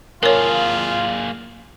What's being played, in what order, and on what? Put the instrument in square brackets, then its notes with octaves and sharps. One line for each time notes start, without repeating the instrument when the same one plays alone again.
[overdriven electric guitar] A#3 G#4 [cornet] F4 [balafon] A#4 C#5